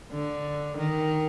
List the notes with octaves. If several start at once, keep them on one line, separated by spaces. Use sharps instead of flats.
D3
D#3